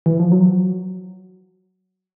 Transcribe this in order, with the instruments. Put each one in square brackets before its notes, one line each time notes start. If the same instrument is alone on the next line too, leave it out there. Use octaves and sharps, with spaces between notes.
[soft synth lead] E3
F3
F#3